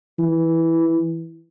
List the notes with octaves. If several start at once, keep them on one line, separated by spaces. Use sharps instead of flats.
E3